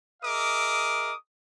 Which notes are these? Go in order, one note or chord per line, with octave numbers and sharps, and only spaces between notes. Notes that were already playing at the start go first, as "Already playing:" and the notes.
G#4 A#4 D#5 E5 D6 D#6